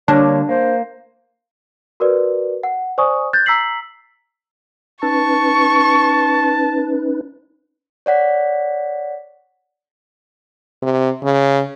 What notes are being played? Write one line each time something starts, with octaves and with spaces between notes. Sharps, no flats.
D3 G3 A#3 D4 C#5
A#3 C5
F#4 A#4 B4 D5
F#5
C5 D5 G#5 C#6 D#6
F#6 G6 A6
A#5 E6 B6 C7 F#7
C#4 D#4 B4 A5 C#6
C#5 D5 F#5 B6
C3
C#3